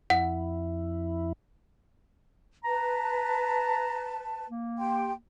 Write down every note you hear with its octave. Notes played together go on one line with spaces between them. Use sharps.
F2 E4 F#5
B4 A5 A#5
A#3
G4 G5 C6